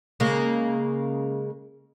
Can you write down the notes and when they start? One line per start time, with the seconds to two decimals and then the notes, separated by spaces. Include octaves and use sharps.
0.20 C#3 G#3 A#3